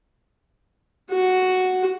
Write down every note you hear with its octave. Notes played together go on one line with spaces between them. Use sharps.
F#4